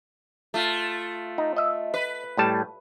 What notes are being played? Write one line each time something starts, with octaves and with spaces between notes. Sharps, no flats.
A3 F4
D#4
D#5 E5
B4
A2 G3 A5